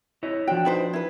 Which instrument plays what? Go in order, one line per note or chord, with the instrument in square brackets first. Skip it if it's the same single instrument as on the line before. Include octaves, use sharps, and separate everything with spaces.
[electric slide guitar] E4 C#5 D#5
[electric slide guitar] F3 D4 F#4 [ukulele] G5
[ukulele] D#4 B4 C5
E4 B4